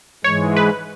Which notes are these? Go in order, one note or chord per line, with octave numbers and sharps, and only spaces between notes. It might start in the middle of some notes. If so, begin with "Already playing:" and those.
G#2 E3 G#3 C#5
B4